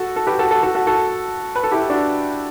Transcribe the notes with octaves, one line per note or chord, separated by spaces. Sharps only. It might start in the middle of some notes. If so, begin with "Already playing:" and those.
Already playing: F#4 A4
A4
G4 B4
F#4 A4
F#4 A4
F#4 A4
F#4 A4
F#4 A4
B4
A4
E4 G4
D4 F#4